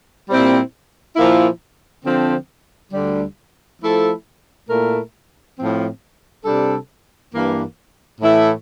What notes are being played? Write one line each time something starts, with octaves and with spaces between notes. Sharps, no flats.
A#2 G3 C4 E4
A#2 F3 A#3 E4
D3 F3 C4
D2 D3 G3
F3 A3 E4 A4
A#2 A3 E4 A#4
A2 F3 C4
C3 G3 D4 A4
G2 E3 A#3
A2 E3 A3 E4 A4